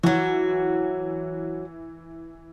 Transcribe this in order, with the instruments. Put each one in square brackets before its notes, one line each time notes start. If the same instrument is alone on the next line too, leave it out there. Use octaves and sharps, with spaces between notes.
[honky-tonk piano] E3 [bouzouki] F#3 F#4